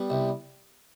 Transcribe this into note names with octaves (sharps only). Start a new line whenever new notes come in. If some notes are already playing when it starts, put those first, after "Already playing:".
Already playing: G3 B3
C2